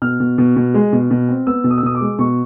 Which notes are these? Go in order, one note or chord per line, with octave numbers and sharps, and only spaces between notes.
B2 F6
B2
B2
B2
G#3
B2
B2
C4
B3 E6
B2
D#6
E6
B2 D#6
D6
G#3
B2 C#6